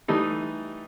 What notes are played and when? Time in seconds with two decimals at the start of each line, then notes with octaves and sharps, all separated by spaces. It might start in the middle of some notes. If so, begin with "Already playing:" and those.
0.08 E3 G3 A3 D#4